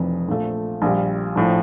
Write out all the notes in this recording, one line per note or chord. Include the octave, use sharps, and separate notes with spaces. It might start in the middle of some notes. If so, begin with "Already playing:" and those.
Already playing: F1 F2 E3
A#1 A#2 F3 A3
A#1 A#2 G3
A#1 A2 F3